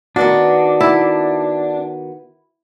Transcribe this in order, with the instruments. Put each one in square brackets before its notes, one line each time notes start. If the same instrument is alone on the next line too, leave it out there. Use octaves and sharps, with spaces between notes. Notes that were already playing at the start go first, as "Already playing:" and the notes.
[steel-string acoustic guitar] D#3 B3 F#4 [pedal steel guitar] D4
[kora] E4